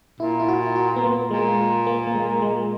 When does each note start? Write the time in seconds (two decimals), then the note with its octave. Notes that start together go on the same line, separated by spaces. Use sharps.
0.20 A#2 E4
0.39 E4
0.48 F#4
0.76 F#4
0.96 B3
1.03 A#3
1.31 A#2 G#3
1.87 A#3
2.07 A#3
2.15 G#3
2.42 G#3